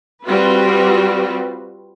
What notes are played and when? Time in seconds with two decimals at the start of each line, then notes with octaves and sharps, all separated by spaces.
0.23 G3 C4 F4 F#4 B4